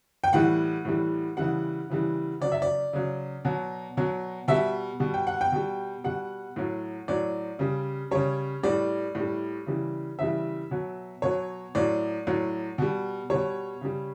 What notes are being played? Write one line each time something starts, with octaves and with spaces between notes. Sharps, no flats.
G5
A2 E3 G3 F#5
A2 E3 G3
C#3 E3 G3 F#5
C#3 E3 G3
C#3 F#3 D5
E5
D5
C#3 F#3
B2 F#3
B2 F#3
B2 G3 E5
B2 G3
G5
F#5
G5
B2 G3
B2 G3 F#5
A2 F#3
A2 F#3 D5
C#3 G3
C#3 G3 C#5
A2 G3 D5
A2 G3
C#3 E3 G3
C#3 E3 G3 E5
B2 F#3
B2 F#3 C#5
A2 F#3 D5
A2 F#3
B2 G3
B2 G3 C#5
C#3 G3